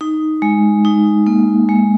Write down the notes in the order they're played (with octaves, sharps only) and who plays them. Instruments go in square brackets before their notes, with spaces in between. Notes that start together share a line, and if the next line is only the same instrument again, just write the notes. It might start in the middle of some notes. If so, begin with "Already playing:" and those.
[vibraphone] D#4
G#3
D#4
A#3
G#3